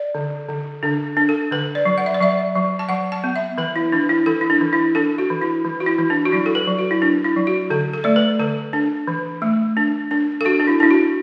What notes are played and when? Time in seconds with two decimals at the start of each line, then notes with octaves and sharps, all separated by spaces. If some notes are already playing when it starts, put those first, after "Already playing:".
Already playing: D5
0.15 D3
0.49 D3
0.83 D3 D4
1.17 D4
1.29 A4
1.52 D3 B4
1.75 D5
1.85 F#3
1.98 F#5
2.06 E5
2.14 D5
2.20 F#3 E5
2.55 F#3
2.79 A5
2.89 F#3 F#5
3.12 A5
3.24 B3
3.36 E5
3.58 E3 B4
3.76 E4
3.92 E3 D4
4.09 E4
4.26 E3 A4
4.41 E4
4.50 D4
4.61 E3
4.73 E4
4.95 D4 A4
5.18 F#4
5.30 E3
5.41 E4
5.64 E3
5.80 F#4
5.86 E4
5.99 E3
6.10 D4
6.25 F#4
6.32 F#3 E4
6.46 A4
6.55 B4
6.67 F#3
6.79 F#4
6.91 E4
7.02 D4
7.24 E4
7.36 F#3
7.47 F#4
7.70 D3 A4
7.93 A4
8.04 A3 D5
8.16 B4
8.39 D3 A4
8.73 D4
9.07 E3
9.42 A3
9.77 D4
10.11 D4
10.41 A4
10.45 D4 F#4
10.60 D4
10.67 E4
10.80 D4 E4
10.90 F#4